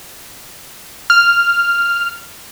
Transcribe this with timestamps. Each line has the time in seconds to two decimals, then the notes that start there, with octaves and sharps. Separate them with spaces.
1.10 F6